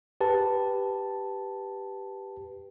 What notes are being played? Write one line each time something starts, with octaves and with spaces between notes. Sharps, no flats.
G4 B4 A5